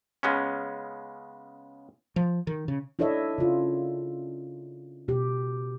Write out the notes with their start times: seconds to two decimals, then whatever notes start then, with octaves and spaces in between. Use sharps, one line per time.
0.23 C#3 G#3 B3 C#4
2.16 F3
2.47 D#3
2.68 C#3
2.99 D4 E4 A4 C#5 D#5 E5
3.38 C#3 F4
5.08 B2 G4